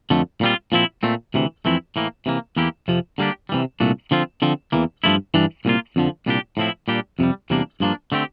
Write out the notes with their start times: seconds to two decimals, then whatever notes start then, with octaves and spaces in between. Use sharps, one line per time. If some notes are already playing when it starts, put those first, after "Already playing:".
0.10 F2 D3 A3
0.41 A#2 G3 C4 F4
0.72 A#2 F3 C4 E4
1.03 A#2 A3 C4
1.34 D2 C3 E3
1.65 F2 E3 A3 C4 E4
1.96 A2 E3 A#3
2.26 C3 E3 A#3
2.56 E2 E3 A#3 E4 G4
2.88 F2 C3 F3
3.18 D3 G3 A#3 D4 G4
3.49 C3 E3 G3
3.80 C2 A#2 A3 D4
4.11 D3 F3 C4 F4
4.42 D3 F3 C4
4.72 E2 E3 A#3
5.04 G2 F3 A3 E4
5.34 G2 E3 G3 D4
5.65 C2 A#2 G3 A#3 F4
5.96 F2 D3 F3
6.26 C2 A#2 G3 D4 G4
6.57 A2 F3 C4 E4
6.88 A#2 G3 D4 G4
7.19 F2 C3 G3
7.50 E2 C3 G3 A#3 D4
7.80 G2 F3 A#3 D4
8.12 D3 A3 C4 G4